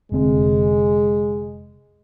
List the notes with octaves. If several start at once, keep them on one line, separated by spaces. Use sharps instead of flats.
F1 D3 G#3 C4